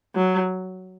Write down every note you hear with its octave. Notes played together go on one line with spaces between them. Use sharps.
F#3